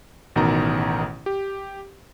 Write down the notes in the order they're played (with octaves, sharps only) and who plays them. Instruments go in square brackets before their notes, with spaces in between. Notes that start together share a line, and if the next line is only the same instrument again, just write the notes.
[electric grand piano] A1 B2 D#3 A#5
G4